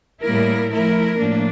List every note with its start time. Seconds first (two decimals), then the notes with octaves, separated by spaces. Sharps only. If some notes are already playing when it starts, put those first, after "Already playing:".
0.22 A2 G3 A#3 E4 A#4
0.70 F3 A3 E4 A#4
1.17 A2 F3 A#3 D4